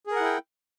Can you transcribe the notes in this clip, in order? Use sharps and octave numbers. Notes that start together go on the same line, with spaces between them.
E4 G#4 A#4 F#5 G5